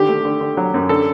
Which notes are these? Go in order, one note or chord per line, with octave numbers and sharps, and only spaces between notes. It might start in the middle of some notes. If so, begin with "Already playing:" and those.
Already playing: D3 D#3 G4
A3
D3
D3
F#3
F#2
D3 A4